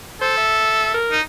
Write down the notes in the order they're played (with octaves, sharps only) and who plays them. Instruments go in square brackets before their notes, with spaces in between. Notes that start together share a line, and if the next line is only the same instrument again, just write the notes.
[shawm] A4 [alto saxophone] C5
[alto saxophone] E5
A#4
[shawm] D#4